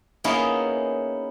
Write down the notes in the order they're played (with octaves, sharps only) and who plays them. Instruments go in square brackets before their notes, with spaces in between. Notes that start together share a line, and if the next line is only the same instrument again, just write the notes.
[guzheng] A#3 B3 C#4 D#4 E4 G#4